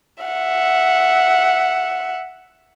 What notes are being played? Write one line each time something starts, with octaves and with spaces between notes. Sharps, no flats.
E5 F#5